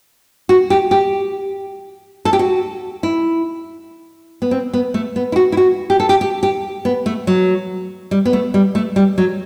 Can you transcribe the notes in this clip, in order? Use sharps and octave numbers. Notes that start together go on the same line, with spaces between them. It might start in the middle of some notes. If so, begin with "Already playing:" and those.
F#4
G4
G4
A4
G4
F#4
E4
B3
C4
B3
A3
B3
E4
F#4
E4
F#4
G4
A4
G4
G4
G4
B3
A3
F#3
G3
B3
A3
G3
A3
G3
F#3